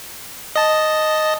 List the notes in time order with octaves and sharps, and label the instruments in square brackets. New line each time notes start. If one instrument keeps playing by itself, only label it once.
[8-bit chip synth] D#5 A5